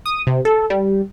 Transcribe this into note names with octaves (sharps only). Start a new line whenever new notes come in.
D#6
C3
A4
G3